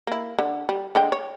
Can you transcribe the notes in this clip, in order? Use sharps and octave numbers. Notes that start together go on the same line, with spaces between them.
A#3 E4
D3
G3
D3 G#3 G5
C#5